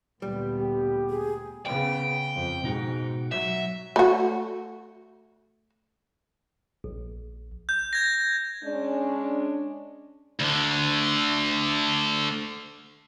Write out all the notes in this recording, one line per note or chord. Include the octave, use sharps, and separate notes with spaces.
D2 A#2 G3 B3
G4
G#4
C#3 B3 G5
F2
G#2 B2 D#4 F#4
F#3 E5
A3 F#4
A#1
G6
G#6 A#6
G#3 C#4 D4
D2 D3